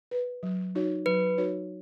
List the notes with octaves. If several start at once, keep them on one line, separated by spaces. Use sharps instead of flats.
B4
F#3
D#4 F#4 C#5
F#3 B4
D#4 F#4 C#5